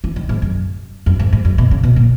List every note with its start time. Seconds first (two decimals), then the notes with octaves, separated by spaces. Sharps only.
0.04 E3
0.16 D#3
0.29 G#2
0.42 F#2
1.06 F#2
1.19 G#2
1.33 G#2
1.45 F#2
1.58 B2
1.71 C#3
1.83 B2
1.96 A#2